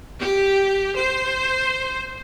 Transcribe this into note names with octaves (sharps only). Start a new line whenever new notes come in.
G4
C5